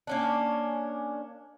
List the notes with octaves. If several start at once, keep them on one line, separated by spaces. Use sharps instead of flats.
A#3 C#4 D4